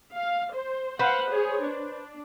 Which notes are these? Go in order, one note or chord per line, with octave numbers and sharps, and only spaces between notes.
F5
C5
B4 C5 F5 F#5
G#4 C#5
D4